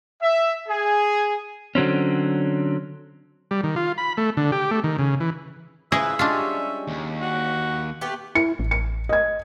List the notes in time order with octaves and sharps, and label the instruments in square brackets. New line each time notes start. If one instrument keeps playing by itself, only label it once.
[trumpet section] E5
G#4
[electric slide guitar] D3 F#3 C4 C#4
[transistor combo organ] G3
D#3
F4
B5
A3
D3
G4
A3
D#3
C#3
E3
[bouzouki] C#3 F3 B4 [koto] E4 G#4 D#5 [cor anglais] E5
[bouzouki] G3 G#3 C#4 [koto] D4 F4
[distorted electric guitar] D#2
[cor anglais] F#4
[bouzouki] A3 B3 G4
[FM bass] E4 [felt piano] C#7
[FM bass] A1
[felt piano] C#7
D#5 G#6